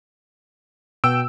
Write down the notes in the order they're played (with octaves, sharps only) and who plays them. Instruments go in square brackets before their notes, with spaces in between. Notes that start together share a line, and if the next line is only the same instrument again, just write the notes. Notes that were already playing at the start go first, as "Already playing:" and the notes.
[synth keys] B2 G5 [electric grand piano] E6 D7